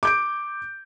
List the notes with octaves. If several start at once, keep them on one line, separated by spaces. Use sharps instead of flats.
D6 G6 D7